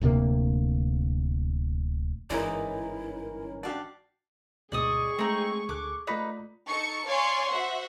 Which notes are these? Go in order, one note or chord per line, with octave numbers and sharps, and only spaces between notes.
D1 D2 C3 A#3
G1 G#2 E3 C#4 D#4 E4 A#4 D5
D4 F#4 G4 D5 F5
D2 G#2 B2 G#4 D5 D#5 C#6 D#6
G#3 A3 C4 D#4
D2 A4 D6 F#6
A3 D#4 F4 B4 D5
D#4 A4 C#6 C#7
C#5 D5 F5 G#5 C6 C#6
F#4 C5 E5 F#5